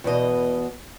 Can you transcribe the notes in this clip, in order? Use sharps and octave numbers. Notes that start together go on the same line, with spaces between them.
E2 B2 D#5